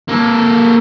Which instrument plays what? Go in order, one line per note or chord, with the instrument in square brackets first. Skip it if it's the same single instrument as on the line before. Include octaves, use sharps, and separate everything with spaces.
[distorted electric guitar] A#3 A4